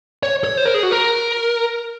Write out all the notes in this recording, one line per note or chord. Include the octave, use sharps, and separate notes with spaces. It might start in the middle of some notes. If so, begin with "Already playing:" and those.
C#5
C#5
C5
A#4
G#4
F#4
A#4